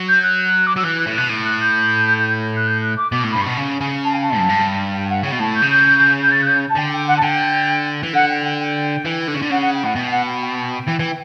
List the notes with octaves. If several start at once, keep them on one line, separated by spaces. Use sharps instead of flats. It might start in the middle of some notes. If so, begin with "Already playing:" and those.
Already playing: F#3
G6
F#6
D6
F#3 E6
E3 F#6
F#6
A2
B2 F#6
A2
F#6
G6
F#6
G6
F#6
D6
B2 D6
A2 C#6
G2 B5
C#6
B2
C#3
C#3
A5
G5
A5
F#2
G2
G5
F#5
C#3 G5
B2
A2 A5
G6
C#3
G6
G6
A6
F#6
G6
A5
D3 G5
G5
F#5
A5
D3 G5
E3
D3 F#5
G5
G5
G5
E3
D3
C#3
D3
C#3 F#5
F#5
G5
A2 F#5
B2 G5
F#5
G5
G5
E3
E3